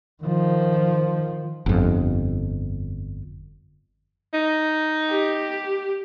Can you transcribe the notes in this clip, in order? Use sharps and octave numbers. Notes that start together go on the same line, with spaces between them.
D#3 F3
G1 F2
D#4
G4